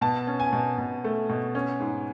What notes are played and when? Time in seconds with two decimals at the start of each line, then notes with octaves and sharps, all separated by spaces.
0.01 B2 A5
0.27 C#4
0.40 G#5
0.53 B2
0.78 B2
1.04 A3
1.29 B2
1.55 C#4
1.80 G#2